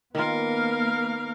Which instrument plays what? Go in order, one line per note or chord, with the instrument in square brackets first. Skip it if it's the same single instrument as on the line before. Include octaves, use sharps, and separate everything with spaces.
[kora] D#3 F4 [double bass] A#3 B3 [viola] A#4 F5